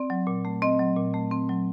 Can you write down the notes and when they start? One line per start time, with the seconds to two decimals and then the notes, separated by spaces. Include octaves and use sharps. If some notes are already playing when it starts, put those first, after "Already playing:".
Already playing: C4 D5
0.10 F#3
0.27 A#2
0.45 A3
0.62 C4 D#5
0.79 F#3
0.96 A#2
1.14 A3
1.31 C4
1.49 F#3